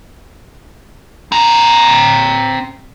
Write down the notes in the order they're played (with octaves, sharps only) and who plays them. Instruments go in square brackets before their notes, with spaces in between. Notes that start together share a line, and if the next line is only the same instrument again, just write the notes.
[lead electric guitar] C4 A#5